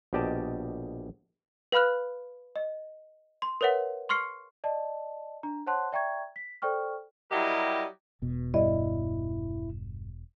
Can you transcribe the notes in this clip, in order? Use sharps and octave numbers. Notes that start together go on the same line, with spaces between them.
A#1 B2 G4 D5 D#5 A5
B4 F5 B5 F6 F#6
D#5
C6
A#4 B4 C#5 E5 F#5
C6 C#6 F6 C7 C#7
D5 D#5 A5
D4 A#5
C5 C#5 F#5 A5 C6 F#6
D5 E5 G5 A#5 C#6 G#6
B6
A4 C5 D5 G5 C#6 F6
F#3 G3 E4 G4 A#4 D#5
E1 B2
G2 E4 D5 D#5